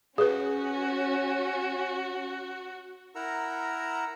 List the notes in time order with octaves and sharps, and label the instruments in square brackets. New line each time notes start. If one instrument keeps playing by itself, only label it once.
[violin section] C#4 [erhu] F#4 [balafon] G#4 B4
[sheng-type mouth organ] E4 A#4 F#5 A#5 E6